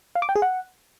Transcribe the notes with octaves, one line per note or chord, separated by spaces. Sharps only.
F5
D6
G5
G#4
F#5